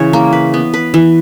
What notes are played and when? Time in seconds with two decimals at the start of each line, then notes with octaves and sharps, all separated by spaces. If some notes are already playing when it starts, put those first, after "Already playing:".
Already playing: C#3 E3 C#5
0.13 A#3
0.33 B4
0.54 B3
0.74 B4
0.94 E3